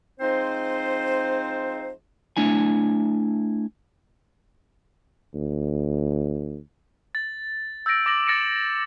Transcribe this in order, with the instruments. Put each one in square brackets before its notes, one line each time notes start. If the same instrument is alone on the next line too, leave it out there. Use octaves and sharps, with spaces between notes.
[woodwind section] F3 G#3 C4 D#4 C5
[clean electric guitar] A3 D4 E4 G#5
[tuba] D2
[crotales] A6
E6 G6 A6 A#6 D7
D6 A6 A#6 F#7
E6 A6 A#6 C#7 D7 E7